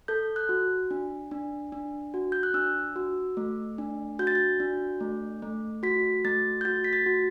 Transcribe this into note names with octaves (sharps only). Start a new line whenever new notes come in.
A4 G6
F#6
F#4
D4
D4
D4
F#4
G6
F#6
D4 E6
F#4
A3
D4
F#4 G6
A6
G6
D4
A3
A3
F#4 B6
A3 A6
G6
F#4 A6
B6
A6
F#4